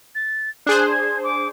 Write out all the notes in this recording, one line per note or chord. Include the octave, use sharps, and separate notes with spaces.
A6
D4 G#4 C5 F#6
G#6
D6